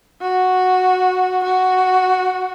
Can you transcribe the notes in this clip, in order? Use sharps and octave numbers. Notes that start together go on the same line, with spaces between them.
F#4
F#4